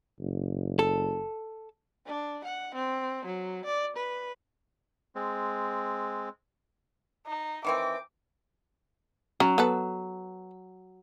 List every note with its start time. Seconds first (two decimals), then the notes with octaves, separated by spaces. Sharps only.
0.20 F#1
0.79 A4
2.06 D4
2.45 F#5
2.75 C4
3.25 F#3
3.65 D5
3.96 B4
5.15 G#3 C4
7.27 D#4
7.64 D#3 E3 C4 D6
9.40 F#3 C#4
9.58 B3 A4 B4